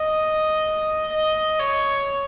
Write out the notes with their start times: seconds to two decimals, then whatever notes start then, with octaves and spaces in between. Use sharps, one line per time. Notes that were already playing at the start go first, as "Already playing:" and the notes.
Already playing: D#5
1.13 D#5
1.60 C#5